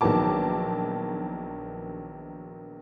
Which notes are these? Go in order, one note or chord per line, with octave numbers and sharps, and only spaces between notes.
A#1 D#3 F#3 B3 A5 D6